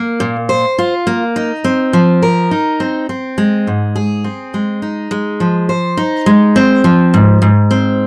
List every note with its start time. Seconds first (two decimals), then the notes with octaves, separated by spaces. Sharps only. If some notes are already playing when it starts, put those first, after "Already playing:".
Already playing: A#3
0.20 A#2
0.49 C5
0.79 F4
1.07 A#3
1.36 D#4
1.64 C4
1.93 F3
2.23 A#4
2.51 D#4
2.80 C4
3.09 C4
3.38 G#3
3.67 G#2
3.96 G#4
4.24 C4
4.54 G#3
4.82 D#4
5.11 G#3
5.40 F3
5.69 C5
5.97 D#4
6.26 G#3
6.56 C4
6.84 F3
7.14 G#2
7.42 G#2
7.71 C4